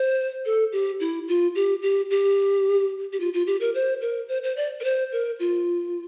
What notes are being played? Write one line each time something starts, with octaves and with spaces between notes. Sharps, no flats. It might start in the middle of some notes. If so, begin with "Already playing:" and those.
Already playing: C5
A4
G4
E4
F4
G4
G4
G4
G4
F4
F4
G4
A#4
C5
A#4
C5
C5
D5
A#4
C5
A#4
F4